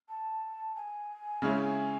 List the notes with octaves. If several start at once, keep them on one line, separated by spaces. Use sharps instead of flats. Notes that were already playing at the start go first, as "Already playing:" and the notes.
A5
G#5
C#3 G#3 C#4 E4